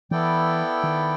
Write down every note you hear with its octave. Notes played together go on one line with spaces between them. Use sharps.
E3 B3 E4 A4 D5 G5
D#3